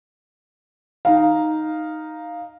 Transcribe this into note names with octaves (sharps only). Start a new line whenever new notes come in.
D#4 F5